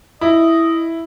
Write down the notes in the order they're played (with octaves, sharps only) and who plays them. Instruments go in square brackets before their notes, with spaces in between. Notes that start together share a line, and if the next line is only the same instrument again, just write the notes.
[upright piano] E4 [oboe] D#5